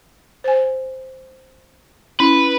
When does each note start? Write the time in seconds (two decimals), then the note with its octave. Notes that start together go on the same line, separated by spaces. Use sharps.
0.44 C5 G#5
2.20 C#4 E4 B4